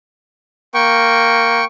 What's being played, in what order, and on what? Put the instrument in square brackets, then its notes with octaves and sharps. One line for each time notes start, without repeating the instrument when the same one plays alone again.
[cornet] A#3 [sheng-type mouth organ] G5 C#6